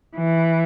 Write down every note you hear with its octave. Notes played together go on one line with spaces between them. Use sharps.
E3